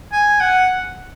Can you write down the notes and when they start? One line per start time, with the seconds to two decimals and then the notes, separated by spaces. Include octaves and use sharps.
0.12 G#5
0.41 F#5